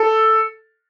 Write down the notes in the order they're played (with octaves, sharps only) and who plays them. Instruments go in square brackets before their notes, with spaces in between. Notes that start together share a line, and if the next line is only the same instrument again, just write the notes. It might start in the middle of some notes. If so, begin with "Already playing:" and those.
Already playing: [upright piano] A4